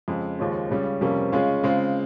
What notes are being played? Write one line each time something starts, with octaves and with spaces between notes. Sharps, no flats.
F2 C#3 G#3
D#2 C#3 F3 G#3 C#4
C#2 C#3 G3 C#4
F2 C3 G3 A#3 C#4
C#3 G#3 C#4 F4
C#3 G#3 C4 F4